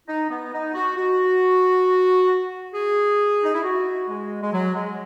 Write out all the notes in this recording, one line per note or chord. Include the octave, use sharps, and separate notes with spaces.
D#4
B3
D#4
F#4
F#4
G#4
D#4
E4
F#4
G#3
G#3
F#3
G#3